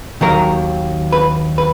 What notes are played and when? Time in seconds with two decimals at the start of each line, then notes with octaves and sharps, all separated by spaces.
0.21 D#2 D#3 F#3 A#4
1.12 B4
1.58 B4